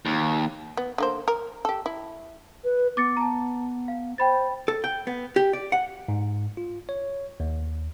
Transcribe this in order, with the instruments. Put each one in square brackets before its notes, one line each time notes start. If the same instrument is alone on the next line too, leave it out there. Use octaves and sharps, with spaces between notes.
[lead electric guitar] D#2
[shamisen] B3
D3 A#3 C5
A#4
G4 A4
E4
[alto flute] B4
[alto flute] B3 [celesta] D6 A6 C#7
[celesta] A5 A#5
F5
[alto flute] C5 [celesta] G5 B5 A6
[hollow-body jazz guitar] A4
G5
B3
G4
D5
F#5
[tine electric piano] G#2
F4
C#5
D#2